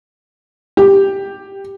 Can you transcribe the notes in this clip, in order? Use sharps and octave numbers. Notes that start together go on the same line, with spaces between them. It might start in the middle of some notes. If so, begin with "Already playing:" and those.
G4